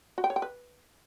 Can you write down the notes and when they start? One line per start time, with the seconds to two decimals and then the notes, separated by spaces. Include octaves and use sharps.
0.18 F#4
0.24 G5
0.30 C#5
0.36 G5
0.42 B4